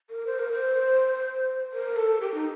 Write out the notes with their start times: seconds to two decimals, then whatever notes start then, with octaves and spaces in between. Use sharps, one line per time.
0.10 A#4
0.26 C5
0.39 A#4
0.52 C5
1.72 A#4
1.96 A4
2.20 G4
2.34 D#4